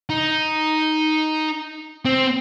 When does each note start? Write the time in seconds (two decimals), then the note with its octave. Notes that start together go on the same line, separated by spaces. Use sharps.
0.10 D#4
2.05 C4